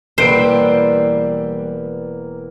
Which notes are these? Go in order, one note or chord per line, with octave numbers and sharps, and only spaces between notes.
E1 G3 A#3 B4 C5 E6 D7